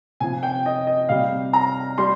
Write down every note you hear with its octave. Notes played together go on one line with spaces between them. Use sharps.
C3 F3 G#5
G5
D#5
D#5
C3 G3 F5
A#5
G3 C6